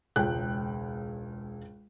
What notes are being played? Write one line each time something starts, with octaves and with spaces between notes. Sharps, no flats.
E1 C#2 G5 F#6